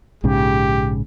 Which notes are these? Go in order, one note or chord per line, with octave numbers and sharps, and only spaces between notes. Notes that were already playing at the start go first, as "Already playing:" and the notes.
A#1 G#2 C#3 G4